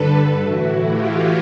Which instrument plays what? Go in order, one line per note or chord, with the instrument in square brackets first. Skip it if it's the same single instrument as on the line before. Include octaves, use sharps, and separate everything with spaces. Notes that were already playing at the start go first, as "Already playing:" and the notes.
Already playing: [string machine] G2 D3 A4 B4
A2 E3 E4 F#4
F4 G4